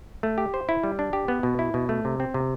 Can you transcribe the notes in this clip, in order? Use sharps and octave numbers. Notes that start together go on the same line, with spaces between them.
A3
G4
C5
E4
G3
D4
G4
B3
B2
E4
B2
A3
C3
C4
C3